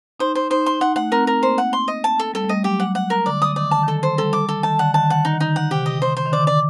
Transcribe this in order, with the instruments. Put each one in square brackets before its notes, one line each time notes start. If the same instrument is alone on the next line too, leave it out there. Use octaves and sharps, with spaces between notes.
[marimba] D#4 [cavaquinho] C5
[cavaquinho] C5
[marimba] D#4 [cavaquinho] C5
[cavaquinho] C6
[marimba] D#4 [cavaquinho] F#5
[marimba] A3 [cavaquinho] F#5
[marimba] C4 [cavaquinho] A#4
[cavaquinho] A#4
[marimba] A#3 [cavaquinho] C5
[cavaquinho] F#5
C6
D#5
A5
A4
[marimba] G3 [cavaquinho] A4
[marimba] A3
[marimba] G3 [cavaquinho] D#5
[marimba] F#3 [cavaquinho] G4
[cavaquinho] F#5
F#5
A#4
[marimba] D3 [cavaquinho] D5
[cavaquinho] D#6
[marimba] D#3 [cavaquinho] D5
[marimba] D3 [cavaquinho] A5
[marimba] D#3 [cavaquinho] A4
[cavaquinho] C5
[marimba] G3 [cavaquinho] A4
[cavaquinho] D6
A4
[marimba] D#3 [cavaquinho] A5
[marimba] D3 [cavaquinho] F#5
[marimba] D#3 [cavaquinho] A5
[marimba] D#3 [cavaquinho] F#5
[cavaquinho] D#4
[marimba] D#3
[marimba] D3 [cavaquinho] D#4
[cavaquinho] F#5
[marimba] C3 [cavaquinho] G4
[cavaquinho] D#5
C5
C5
[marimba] D#3
[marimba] D3 [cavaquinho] D5
[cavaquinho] D5